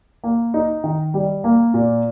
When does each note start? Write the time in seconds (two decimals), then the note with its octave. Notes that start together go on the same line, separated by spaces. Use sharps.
0.23 A#3
0.54 D#4
0.84 D#3
1.14 G3
1.44 A#3
1.74 A#2